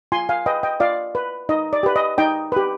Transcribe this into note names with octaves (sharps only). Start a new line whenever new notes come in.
F4 G#5 C6
F5 G#5
B4 D#5 G5
D#5 G5
F4 D5 F5
B4
D#4 D#5
D5
G4 B4
D#5
D#4 D#5 G5
G4 B4